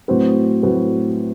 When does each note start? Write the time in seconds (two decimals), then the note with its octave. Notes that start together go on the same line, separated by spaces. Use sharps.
0.08 A2 F#3 C4 F#4 B4
0.63 A2 F#3 C4 F#4 B4